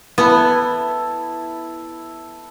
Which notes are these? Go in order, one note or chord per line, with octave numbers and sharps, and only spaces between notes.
B3 E4 A4